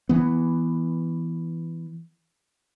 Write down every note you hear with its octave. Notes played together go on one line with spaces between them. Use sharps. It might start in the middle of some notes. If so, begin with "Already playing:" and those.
E3 B3